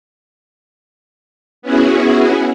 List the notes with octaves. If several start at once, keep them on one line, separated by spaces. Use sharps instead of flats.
B3 C#4 E4 F#4 G#4